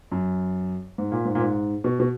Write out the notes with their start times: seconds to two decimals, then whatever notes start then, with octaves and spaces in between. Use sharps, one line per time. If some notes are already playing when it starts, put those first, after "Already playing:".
0.12 F#2
0.98 G#2
1.12 A#2
1.25 G#2
1.35 A#2
1.41 G#2
1.84 B2
2.00 B2